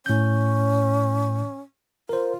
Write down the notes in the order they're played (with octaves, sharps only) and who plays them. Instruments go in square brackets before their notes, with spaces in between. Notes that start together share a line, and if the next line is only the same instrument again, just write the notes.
[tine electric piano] A2 G6 [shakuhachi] C#4
[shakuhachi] F4 [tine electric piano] A#4 C5